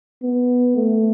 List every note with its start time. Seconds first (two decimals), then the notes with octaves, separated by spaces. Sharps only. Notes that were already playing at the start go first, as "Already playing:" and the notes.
0.23 B3
0.76 A3